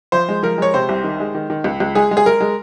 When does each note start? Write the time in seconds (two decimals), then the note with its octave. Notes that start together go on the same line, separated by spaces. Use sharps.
0.12 F3 C5
0.29 G#3
0.43 F3 A#4
0.58 G#3 C#5
0.74 C3 C5
0.89 C2
1.04 D#3
1.20 G#3
1.35 D#3
1.50 D#3
1.64 C#2
1.80 C#2
1.95 G#3 G#4
2.11 G#3
2.17 G#4
2.26 G#3 A#4
2.41 G#3